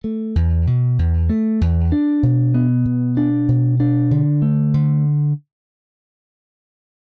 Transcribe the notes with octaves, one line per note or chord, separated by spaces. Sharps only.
A3
E2
B2
E2
A3
E2
D4
B2
B3
B2
D4
B2
D4
D3
A3
D3